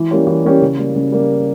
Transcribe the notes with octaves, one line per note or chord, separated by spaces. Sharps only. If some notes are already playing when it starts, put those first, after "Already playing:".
Already playing: E3
G3 A#3 C#4 G4
E3
G3 A#3 C#4 G4
C#3
G3 A#3
C#3
G3 A#3